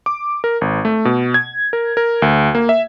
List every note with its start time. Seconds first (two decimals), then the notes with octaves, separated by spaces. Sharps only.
0.06 D6
0.44 A#4
0.61 G#1
0.85 A3
1.05 B2
1.34 G#6
1.73 A#4
1.97 A#4
2.22 D2
2.55 A#3
2.69 E5